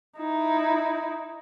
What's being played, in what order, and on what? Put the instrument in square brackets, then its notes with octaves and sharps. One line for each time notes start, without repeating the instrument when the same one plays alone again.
[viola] D#4 E4